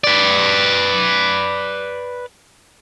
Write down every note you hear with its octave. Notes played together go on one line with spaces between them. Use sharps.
B4 D5